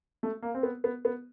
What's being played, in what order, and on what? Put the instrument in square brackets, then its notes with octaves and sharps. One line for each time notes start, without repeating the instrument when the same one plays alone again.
[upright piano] A3
A#3
C4
B3
B3
B3